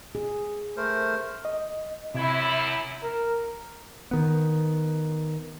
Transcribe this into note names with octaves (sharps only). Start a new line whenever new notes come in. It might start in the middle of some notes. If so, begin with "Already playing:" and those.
G#4
A3 A#4 C5
D#5
F#2 C3 E4 G#6
A#4
D#3 B3